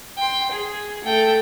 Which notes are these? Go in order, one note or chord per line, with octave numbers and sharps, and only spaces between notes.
G5 C6
G#4
A3 G5